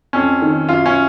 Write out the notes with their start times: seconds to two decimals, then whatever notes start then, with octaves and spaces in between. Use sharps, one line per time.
0.13 F2 C#4
0.42 D#3
0.69 F#2 F4
0.86 C#4